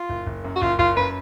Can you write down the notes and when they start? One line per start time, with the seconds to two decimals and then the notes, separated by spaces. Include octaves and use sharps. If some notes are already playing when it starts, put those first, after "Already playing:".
Already playing: F4
0.09 F#1
0.27 F#1
0.44 F#2
0.56 F#4
0.62 F#1 F4
0.79 F#1 F4
0.96 F#2 B4